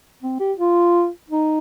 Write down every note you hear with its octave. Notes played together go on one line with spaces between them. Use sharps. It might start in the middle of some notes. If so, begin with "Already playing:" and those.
C4
G4
F4
D#4